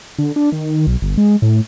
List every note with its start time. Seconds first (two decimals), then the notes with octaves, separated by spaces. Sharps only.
0.18 D3
0.36 D4
0.52 D#3
0.87 B1
1.02 G1
1.17 G#3
1.42 A2